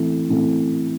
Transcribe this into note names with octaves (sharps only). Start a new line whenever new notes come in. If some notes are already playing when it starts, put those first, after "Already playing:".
Already playing: E3 A3 C4
E3 A3 C4